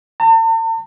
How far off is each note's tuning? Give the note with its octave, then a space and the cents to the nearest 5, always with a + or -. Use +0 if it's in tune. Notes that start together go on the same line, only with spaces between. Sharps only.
A5 +45